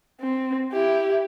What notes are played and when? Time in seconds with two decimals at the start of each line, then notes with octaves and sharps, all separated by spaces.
0.21 C4
0.72 E4 G4